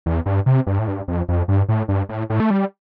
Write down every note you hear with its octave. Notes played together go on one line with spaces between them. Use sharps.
E2
G2
C3
G2
A2
G2
F2
F2
G2
A2
G2
A2
A2
A3
G3